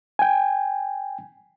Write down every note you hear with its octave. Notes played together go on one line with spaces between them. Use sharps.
G5 G#5